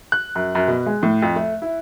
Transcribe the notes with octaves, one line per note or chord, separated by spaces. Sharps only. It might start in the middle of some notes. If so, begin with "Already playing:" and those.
F#6
F#2
F#2
B2
G#3
A2
F2
A3
E4